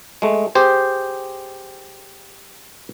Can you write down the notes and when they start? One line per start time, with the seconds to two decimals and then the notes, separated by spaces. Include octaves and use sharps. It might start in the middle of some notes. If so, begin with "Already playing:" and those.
0.22 G#3 A3
0.55 G4 G#4 C5